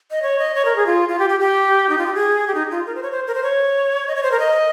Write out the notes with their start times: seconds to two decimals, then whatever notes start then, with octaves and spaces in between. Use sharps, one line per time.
0.11 D#5
0.22 C#5
0.39 D#5
0.55 C#5
0.65 A#4
0.76 G#4
0.87 F4
1.09 F4
1.19 G4
1.30 G4
1.40 G4
1.89 D#4
1.98 F4
2.06 G4
2.15 G#4
2.47 G4
2.55 D#4
2.71 F4
2.86 A#4
2.95 C5
3.03 C#5
3.12 C5
3.27 A#4
3.35 C5
3.43 C#5
4.08 D#5
4.15 C#5
4.23 C5
4.32 A#4
4.40 D#5